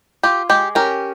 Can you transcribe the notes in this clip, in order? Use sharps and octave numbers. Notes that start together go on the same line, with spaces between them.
F4 G4
G#3 G4
C#4 G4 A#4